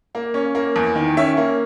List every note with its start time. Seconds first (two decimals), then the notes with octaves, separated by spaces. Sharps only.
0.15 A#3
0.34 C#4
0.55 A#3
0.76 E2
0.95 D#3
1.17 C#4 E5
1.37 A#3